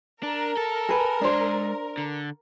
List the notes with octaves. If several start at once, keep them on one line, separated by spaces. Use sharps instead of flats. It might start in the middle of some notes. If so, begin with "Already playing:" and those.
D4 A#4
A4
G#4 B4
G#3 D4 C5 A#5
D3